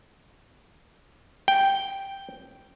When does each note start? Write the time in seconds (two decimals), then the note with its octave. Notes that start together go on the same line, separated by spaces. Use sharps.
1.48 G5